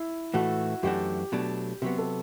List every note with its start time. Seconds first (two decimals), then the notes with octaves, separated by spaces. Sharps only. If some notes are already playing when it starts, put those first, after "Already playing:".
Already playing: E4
0.34 A2 E3 A3 F#4
0.83 F#2 E3 A3 D4 F#4 G4
1.32 B2 F#3 A3 D4
1.82 C3 F#3 B3 G4
1.98 A4